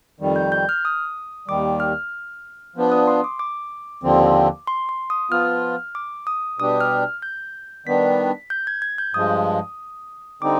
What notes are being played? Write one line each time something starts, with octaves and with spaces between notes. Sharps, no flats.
F2 D#3 G3
G6
G6
F6
D#6
D#2 D#3 G3 D6
F6
F3 B3 D4
D#6
C6
D6
D6
D#2 D3 F3 C4
C6
C6
D#6
F3 B3 F4 F6
D6
D#6
B2 G3 D4 G4 D#6
F6
G6
D#3 G3 B3 D4 B6
G6
G#6
G#6
G6
G2 F3 G#3 D#6
D3 G3 C4 D#4 D6